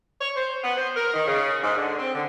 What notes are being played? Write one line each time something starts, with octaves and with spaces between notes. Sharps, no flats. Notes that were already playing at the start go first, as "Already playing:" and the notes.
C#5
C5
B3
C5
A#4
D#3
C#3
G#2
D3
C4
D3